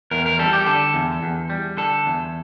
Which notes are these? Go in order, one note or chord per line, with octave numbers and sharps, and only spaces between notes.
E2 A#4
A#4
G3 A4
G4
D3 A4
E2
E2
G3
D3 A4
E2